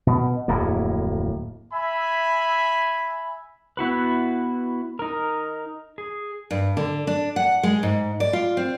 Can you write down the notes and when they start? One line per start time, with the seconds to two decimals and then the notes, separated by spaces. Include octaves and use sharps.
0.07 B2
0.48 D1 F2 A2 A#3
1.73 E5 G#5 B5
3.77 B3 E4 F#4 B4
4.99 D#4 A#4
5.98 G#4
6.51 G2
6.77 D3
7.07 D4
7.36 F#5
7.63 G#3
7.83 G#2
8.20 D5
8.33 F4
8.57 C4